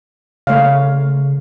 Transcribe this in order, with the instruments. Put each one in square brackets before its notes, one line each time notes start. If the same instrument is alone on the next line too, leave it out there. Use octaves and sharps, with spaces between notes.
[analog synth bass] C#3 [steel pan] A3 C#5 F5